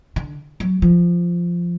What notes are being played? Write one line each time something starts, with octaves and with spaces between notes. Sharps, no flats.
D3
F#3
F3